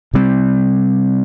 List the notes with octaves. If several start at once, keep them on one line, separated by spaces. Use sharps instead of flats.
C3 G3 C4